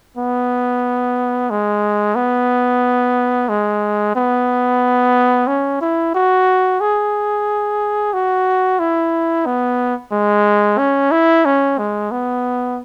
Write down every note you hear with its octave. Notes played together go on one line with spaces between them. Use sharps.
B3
G#3
B3
G#3
B3
C#4
E4
F#4
G#4
F#4
E4
B3
G#3
C#4
E4
C#4
G#3
B3